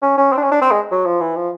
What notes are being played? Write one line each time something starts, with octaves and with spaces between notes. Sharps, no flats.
C#4
C#4
C4
D4
C#4
D4
C4
G#3
F#3
F3
E3
F3